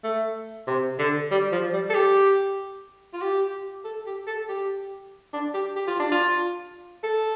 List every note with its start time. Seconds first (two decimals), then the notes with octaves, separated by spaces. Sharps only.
0.04 A3
0.67 C3
0.99 D3
1.31 G3
1.52 F3
1.73 G3
1.90 A4
1.95 G4
3.14 F4
3.22 G4
3.85 A4
4.07 G4
4.27 A4
4.49 G4
5.33 D4
5.54 G4
5.76 G4
5.87 F4
6.00 D4
6.12 F4
7.03 A4